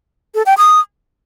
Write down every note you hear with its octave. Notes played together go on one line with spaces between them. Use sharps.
A4
G5
D#6